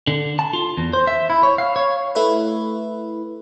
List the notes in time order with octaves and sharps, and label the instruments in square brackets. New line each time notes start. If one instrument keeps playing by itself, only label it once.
[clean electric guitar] D3
A5
F4
E2
C5
E5
E4
C#5
F5
C#5
[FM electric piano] A3 E4 B4